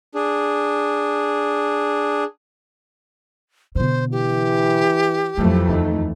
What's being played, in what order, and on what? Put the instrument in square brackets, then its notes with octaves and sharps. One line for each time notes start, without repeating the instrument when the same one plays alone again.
[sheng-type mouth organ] D4 G#4
[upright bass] B2 D3 [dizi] C5
[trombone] E3 [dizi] G4
[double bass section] F2 E3 A3 [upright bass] F#3
[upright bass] D#2 [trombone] D#4